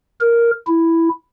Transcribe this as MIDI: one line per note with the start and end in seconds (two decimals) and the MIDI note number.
0.20 0.51 70
0.67 1.09 64